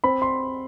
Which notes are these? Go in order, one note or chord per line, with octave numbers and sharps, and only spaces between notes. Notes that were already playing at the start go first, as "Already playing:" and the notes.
C4 B5
C6